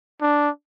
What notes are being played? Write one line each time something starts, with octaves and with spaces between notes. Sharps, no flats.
D4